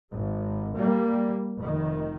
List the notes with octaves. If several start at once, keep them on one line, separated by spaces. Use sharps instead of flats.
G#1
G3 A#3
F1 D#3